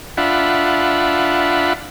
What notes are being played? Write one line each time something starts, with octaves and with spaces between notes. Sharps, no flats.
D4 F4 E5 F#5 B5